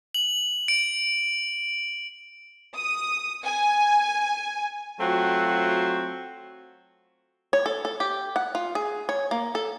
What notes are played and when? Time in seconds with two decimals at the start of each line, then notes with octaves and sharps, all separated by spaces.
0.14 F#7
0.68 D7
2.75 D#6
3.45 G#5
5.00 F#3 A3 C4 F4 F#4
7.53 C#5
7.66 A4
7.85 A4
8.00 G4
8.36 F#5
8.55 F4
8.75 G#4
9.09 C#5
9.31 A#3
9.55 A4